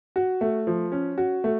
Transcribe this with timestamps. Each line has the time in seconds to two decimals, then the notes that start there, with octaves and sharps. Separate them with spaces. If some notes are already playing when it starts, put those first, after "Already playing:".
0.16 F#4
0.41 A3
0.67 F3
0.92 C#4
1.18 F#4
1.44 A3